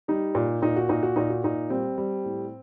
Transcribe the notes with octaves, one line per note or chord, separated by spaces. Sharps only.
G3 D#4
A#2
A#2 D#4
F#4
A#2 D#4
F#4
A#2 D#4
F#4
A#2 D#4
G3 C4
G3
A2